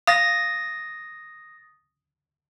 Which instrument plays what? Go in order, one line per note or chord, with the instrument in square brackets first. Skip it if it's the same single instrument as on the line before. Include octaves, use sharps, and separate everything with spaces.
[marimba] F5 [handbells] D#6 A6 A#6